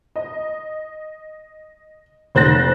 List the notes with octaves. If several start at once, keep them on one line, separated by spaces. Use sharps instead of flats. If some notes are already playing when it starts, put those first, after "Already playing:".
D#5
F1 C5 F#6 A6 A#6